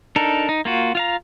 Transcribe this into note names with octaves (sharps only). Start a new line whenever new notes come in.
D4 D#4 A4 A#4
D#4
A#3 F4 F#4
F4 F5 A#5